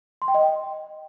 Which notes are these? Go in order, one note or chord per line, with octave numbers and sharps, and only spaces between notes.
C6
G5
D#5
G5